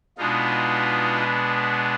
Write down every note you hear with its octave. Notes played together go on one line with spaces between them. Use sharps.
B2 G#3 B3 D4 D#4 F4